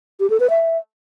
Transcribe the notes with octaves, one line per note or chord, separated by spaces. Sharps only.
G4
A4
B4
E5